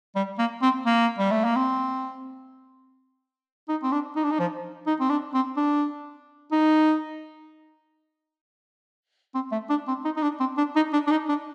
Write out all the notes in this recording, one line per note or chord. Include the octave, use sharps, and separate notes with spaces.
G3
A#3
C4
A#3
G3
A3
A#3
C4
D#4
C4
D4
D#4
D4
D#4
F3
D#4
C4
D4
C4
D4
D#4
C4
A3
D4
C4
D#4
D#4
D4
C4
D4
D#4
D4
D4
D#4
D4